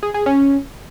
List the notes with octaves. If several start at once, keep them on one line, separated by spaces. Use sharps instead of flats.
G#4
G#4
C#4